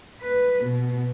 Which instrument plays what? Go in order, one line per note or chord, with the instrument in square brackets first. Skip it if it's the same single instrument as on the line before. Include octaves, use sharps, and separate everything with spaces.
[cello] B4
B2